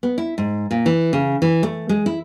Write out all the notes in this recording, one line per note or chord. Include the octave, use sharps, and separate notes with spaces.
B3
E4
G#2
A#2
E3
C#3
E3
A3
G#3
E4